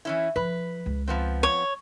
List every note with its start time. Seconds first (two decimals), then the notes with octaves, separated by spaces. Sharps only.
0.05 E3 C#4 E4
0.36 F3 B4
0.86 C#2
1.08 F3 B3 C4
1.43 C#5